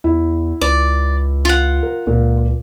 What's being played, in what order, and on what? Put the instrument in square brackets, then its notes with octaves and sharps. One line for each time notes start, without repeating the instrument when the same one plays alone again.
[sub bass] E2 [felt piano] E4
[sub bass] C#2 [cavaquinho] D5
[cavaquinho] F4 F#5
[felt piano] A#4
[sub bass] C#2 [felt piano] A#2 A#4